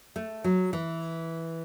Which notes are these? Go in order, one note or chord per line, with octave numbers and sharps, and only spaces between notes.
A3
F#3
E3